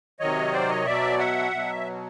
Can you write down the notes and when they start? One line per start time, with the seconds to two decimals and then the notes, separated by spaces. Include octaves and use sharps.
0.20 C3 D#3 F#3 C#5 D#5
0.53 C5 D5
0.69 C#5 D#5
0.85 B2 F#3 D5 E5
1.19 E5 F#5
1.52 B2 F#3